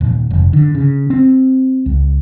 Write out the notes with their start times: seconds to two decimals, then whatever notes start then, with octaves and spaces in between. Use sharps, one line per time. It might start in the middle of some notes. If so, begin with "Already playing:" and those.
0.01 D#1
0.31 F1
0.53 D3
0.75 C#3
1.10 C4
1.86 C#2